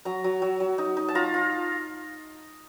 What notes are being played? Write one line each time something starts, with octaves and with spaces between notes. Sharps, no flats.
F#3 A#5
F#3
F#3
F#3
D#4
D#4
A5
F4 A#5
F4